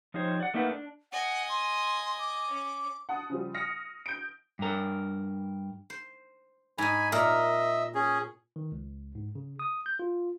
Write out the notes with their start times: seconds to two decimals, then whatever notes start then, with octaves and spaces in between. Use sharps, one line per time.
0.14 F3 D#4 G4 C5 C#5
0.40 D5 F#5
0.54 A3 A#3 D#4 A#4 B4 F#5
0.71 D4
1.12 D#5 F#5 G#5
1.49 C6
2.19 D6
2.50 C#4
3.09 F#5 A5 D#6
3.30 C#3 F3 G3
3.54 D#6 F6 A#6 C#7
4.06 G6 D7
4.59 G2 A#4
5.90 C5
6.78 G#2 D#4 G#5 B5
7.12 A#2 A#4 D#5 E5
7.95 C#4 G#4
8.56 D#3
8.72 C#2
9.15 G#2
9.35 C#3
9.59 D#6
9.86 G6
9.99 F4